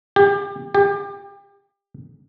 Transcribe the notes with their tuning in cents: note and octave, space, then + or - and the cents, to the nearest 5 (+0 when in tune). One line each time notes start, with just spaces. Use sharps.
G4 +30
G4 +30